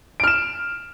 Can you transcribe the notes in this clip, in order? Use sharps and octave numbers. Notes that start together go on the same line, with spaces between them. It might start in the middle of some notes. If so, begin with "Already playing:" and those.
F6 D7 E7